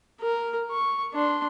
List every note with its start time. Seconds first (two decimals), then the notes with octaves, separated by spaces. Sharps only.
0.21 A#4
0.72 C#6
1.14 D4 C6